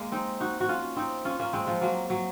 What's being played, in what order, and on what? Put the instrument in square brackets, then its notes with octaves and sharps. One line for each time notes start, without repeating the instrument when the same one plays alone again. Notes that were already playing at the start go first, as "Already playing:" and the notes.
Already playing: [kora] G#3 A#3
C4 D#4
D#4 F#4
F#4
C#4 F4
C4 D#4
C#4 F4
A#3 C#4
G#3 C4
F3 G#3
F#3 A#3
F#3